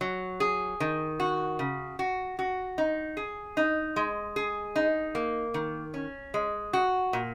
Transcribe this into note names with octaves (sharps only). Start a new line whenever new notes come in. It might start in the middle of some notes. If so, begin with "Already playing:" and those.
F#3
G#4
D#3
F#4
C#3
F#4
F#4
D#4
G#4
D#4
G#3
G#4
D#4
A#3
D#3
C#4
G#3
F#4
A#2